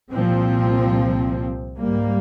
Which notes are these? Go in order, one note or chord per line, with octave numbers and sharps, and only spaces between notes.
C2 A#2 F3 C4
G#2 G3 A#3